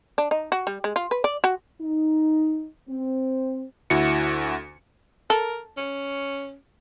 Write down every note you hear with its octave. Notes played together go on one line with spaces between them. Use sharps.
D4
D#4
F#4
G3
G#3
F4
B4
D5
F#4
D#4
C4
D2 E4 F#4 C#7
A4 A#4
C#4